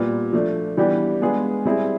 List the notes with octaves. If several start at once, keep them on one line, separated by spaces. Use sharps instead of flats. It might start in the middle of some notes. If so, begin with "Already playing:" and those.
Already playing: A#2 G3 B3
F3 A3 D4
E3 G3 B3 D4 G4
G#3 B3 D4 F4 G#4
G3 C4 E4 G#4